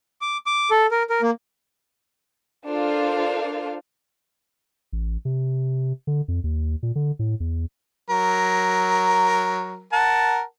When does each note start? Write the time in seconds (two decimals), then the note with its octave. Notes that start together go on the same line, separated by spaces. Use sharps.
0.21 D6
0.46 D6
0.71 A4
0.91 A#4
1.10 A#4
1.22 A#3
2.68 D4 F4 A4 A#4 C5 F5
4.93 A1
5.25 C3
6.07 D3
6.28 F2
6.44 D#2
6.83 A#2
6.96 D3
7.19 A2
7.40 E2
8.10 F#3 A#4
9.93 A#4 F#5 A5